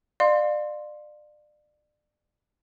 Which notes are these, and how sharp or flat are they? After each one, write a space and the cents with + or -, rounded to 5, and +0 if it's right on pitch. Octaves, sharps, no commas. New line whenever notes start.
D5 +30 F5 +15 C6 +0